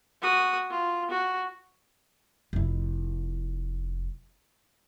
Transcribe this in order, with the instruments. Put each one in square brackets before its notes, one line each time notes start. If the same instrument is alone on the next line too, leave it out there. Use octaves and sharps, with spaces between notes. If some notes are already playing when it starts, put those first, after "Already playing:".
[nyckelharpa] F#4 D#6
F4
F#4
[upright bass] F1 E4